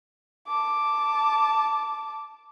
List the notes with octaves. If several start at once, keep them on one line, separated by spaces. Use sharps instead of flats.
A5 D6